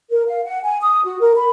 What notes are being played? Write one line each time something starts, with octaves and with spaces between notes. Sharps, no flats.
A#4
F5
F#5
G#5
D#6
F#4
A#4
B5